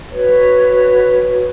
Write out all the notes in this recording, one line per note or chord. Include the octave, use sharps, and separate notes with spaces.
F#4 B4 C#5